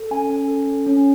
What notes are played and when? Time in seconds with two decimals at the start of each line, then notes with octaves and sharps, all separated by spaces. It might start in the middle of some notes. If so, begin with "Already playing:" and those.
Already playing: A4
0.11 C#4 G#5
0.29 C#4
0.48 A4
0.67 C#4
0.86 C#4